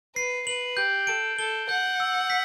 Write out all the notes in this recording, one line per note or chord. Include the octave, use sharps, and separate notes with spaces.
B4 C7
B4 F#7
G4 G6
A4 D7
A4 G7
F#5 G6
E6
B6